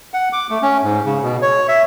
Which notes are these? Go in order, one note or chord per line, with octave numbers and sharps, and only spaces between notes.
F#5
D6
A3
C#4
G#2
C#3
B2
C#5
E5